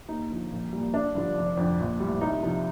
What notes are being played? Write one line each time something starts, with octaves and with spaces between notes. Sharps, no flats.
D#2 D#4
D3 F3
A#1
A#2 G3
G1 D4
G2 D3 F3
F1
F2 D3
A#1
A2 G3
C2 D#4
C3 F3